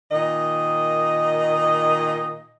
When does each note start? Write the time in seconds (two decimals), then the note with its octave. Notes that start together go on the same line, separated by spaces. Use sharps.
0.11 A#2 D#3 D#5